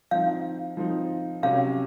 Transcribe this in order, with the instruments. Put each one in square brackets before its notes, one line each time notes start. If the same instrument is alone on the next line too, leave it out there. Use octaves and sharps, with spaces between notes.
[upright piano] F3 C4 D#4 [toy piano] F5
[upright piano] F3 C4 D#4
[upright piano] C3 F#3 C#4 [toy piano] F5